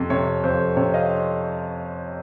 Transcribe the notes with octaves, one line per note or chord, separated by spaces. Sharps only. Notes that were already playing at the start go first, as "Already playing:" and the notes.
Already playing: F2 C3
C3 C#5
F2 C5
C3 C#5
D#5 F5